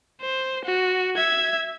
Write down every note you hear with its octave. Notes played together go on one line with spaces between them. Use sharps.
C5
F#4
E5 G#6